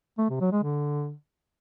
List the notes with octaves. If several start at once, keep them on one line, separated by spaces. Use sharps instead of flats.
A3
C3
F#3
G#3
D3